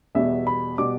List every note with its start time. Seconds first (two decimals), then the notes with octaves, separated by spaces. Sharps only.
0.15 E2 B2 G3 E5
0.47 B5
0.78 B2 G3 D6